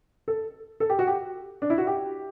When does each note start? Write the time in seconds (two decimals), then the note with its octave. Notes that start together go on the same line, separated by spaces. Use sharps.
0.28 A4
0.80 A4
0.90 G4
0.99 F#4
1.07 G4
1.62 D4
1.70 E4
1.78 F#4
1.87 G4